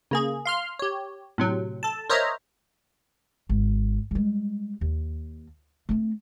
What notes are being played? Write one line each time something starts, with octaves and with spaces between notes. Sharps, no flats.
C#3 A#3 G#4
F5 C6 F6
G4 C#5
A2 C3 F#3
A4 A5
A#4 C5 C#5 D#5 E5 A#5
G#1
G3 G#3
D#2
A3 C4